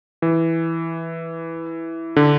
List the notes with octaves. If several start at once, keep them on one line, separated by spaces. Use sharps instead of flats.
E3
D3